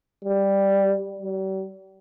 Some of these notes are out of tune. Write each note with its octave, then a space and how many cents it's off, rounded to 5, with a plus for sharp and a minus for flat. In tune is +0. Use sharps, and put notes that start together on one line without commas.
G3 +5
G3 -45